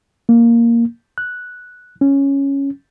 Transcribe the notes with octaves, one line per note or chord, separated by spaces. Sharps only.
A#3
F#6
C#4